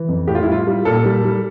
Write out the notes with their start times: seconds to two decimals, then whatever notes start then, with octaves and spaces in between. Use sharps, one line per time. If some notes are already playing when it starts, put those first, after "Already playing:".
Already playing: E3
0.08 F2
0.27 A2 G4
0.35 F4
0.43 E4
0.47 G3 F4
0.67 G3
0.85 A#2 A4
1.05 G3
1.25 G3